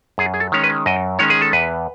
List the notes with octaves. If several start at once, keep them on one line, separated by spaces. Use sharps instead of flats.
F#2 G#4
G#4
A4
D#3 G#3 C#4 C#5
B4
F#2 D#5
D#3 G#3 C#4 C#5
G#4
A4
E2 B4